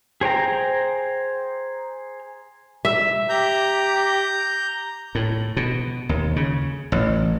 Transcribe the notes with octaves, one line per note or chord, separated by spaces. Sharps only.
G#4 C5 G5 A#5
E5
G4 A#5 G6
A2
B2
D#2
C#3
A1